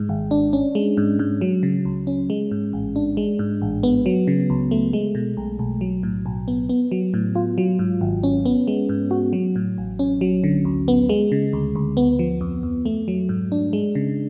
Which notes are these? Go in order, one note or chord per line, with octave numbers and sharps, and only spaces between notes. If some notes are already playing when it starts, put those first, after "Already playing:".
Already playing: G#2 G#3
G#1
D4
C#4
G#3
G#2
G#2
F#3
C#3
C#2
C#4
G#3
G#2
A1
D4
G#3
G#2
A1
B3
F#3
C#3
C#2
A3
G#3
B2
B1
B1
F#3
A2
B1
B3
B3
F#3
A2
F4
F#3
G#2
G#1
C#4
B3
G#3
G#2
F#4
F#3
A2
A1
C#4
F#3
D3
D2
B3
G#3
C#3
D2
D2
B3
F3
F2
F2
A3
F#3
G#2
D4
G#3
C#3